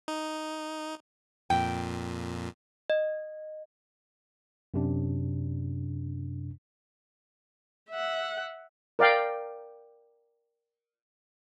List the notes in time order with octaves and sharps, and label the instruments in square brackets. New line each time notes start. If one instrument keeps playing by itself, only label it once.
[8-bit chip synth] D#4
[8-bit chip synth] F2 A#2 [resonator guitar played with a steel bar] G5
[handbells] D#5
[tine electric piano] F#2 C3 D4
[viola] E5 F#5
[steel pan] A#4 D5 F5 G5